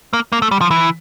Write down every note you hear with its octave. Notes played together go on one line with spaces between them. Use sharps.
A#3
A#3
A3
G3
F3
E3